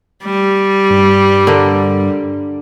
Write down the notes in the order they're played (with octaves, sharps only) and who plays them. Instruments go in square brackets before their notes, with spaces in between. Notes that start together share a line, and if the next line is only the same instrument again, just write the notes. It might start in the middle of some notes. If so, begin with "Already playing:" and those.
[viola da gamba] G3
[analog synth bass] G2
[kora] D3 A#4